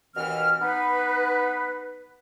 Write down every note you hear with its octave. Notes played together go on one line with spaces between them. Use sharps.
D#2 B2 E3 C4 F6
B3 D#4 B4